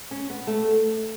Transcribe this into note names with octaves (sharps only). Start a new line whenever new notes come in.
C#4
B3
A3